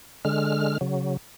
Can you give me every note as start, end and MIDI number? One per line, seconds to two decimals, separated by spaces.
0.25 0.78 50
0.25 0.78 56
0.25 0.78 89
0.81 1.17 49
0.81 1.17 54